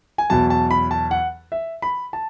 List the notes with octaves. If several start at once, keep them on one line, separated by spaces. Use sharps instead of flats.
G#5
E2 B2 F#3 A5
A5
B5
A5
F#5
E5
B5
A5